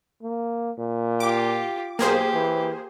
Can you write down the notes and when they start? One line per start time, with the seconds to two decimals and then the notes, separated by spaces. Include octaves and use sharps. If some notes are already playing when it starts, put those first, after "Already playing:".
0.22 A#3
0.78 A#2
1.20 F4 G4 D6
1.99 B1 A#3 G4 G#4 C5
2.33 E3